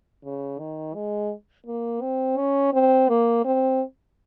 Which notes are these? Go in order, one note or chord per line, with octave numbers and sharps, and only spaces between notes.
C#3
D#3
G#3
A#3
C4
C#4
C4
A#3
C4